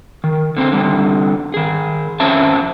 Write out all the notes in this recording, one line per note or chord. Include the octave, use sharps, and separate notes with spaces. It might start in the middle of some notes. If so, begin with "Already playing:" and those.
D#3
D3 C4 C5
D3 G3 B3 C4
D#3 G#4
F2 C4 C#4 E5 A5